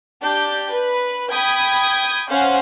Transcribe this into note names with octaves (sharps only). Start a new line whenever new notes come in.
D4 G4 G6
B4
G5 B5 D#6 G#6
C#4 C5 F5 F#5 G#5